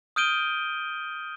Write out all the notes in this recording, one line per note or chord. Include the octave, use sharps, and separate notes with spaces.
D#6 F6 G6 D7 D#7 G7